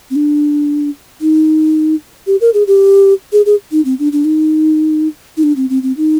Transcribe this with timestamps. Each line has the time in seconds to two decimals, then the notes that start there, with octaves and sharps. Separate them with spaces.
0.10 C4
0.16 D4
1.21 D#4
2.27 G4
2.41 A#4
2.54 G#4
2.67 G4
3.32 G#4
3.46 G#4
3.72 D#4
3.85 C4
3.99 D4
4.12 D4
4.25 D#4
5.37 D#4
5.43 D4
5.56 C4
5.70 C4
5.83 C4
5.97 D#4